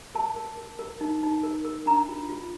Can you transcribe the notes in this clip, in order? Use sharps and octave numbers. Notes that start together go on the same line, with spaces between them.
A#4 A5
A#4
A#4
A#4
D#4
D#4
A#4
A#4
D4 A#5
F4
F4